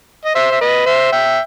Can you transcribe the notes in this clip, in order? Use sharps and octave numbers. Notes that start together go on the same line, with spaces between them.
D#5
C5 E5
E5
B4 D#5
C5 E5
E5 G5